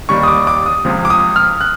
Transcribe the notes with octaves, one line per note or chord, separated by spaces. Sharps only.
D#2 D#3 G3 C#6
D#6
D6
D6
D#6
C#2 C3 F3
D6
D#6
F6
F#6